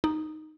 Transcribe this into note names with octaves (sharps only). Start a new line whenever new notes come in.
D#4